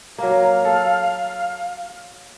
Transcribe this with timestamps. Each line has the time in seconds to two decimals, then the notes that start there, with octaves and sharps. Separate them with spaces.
0.18 F#3 A#3 F5
0.65 A4